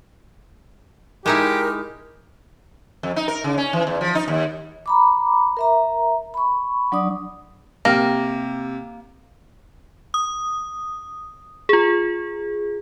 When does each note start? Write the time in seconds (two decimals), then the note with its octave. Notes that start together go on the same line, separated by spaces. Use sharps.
1.26 G#3 D#4 E4 G4 A#4
3.03 F2
3.16 D#4
3.28 A#4
3.44 C#3
3.58 C#4
3.73 E3
3.87 E2
4.01 F3
4.15 D#4
4.28 D#2
4.86 A#5 B5 D6
5.57 A#4 E5 A#5
6.34 B5 C#6
6.92 F#3 D4 D5 D#6
7.85 C3 A#3 G5 F6 A#6
10.14 D#6
11.69 F4 G#4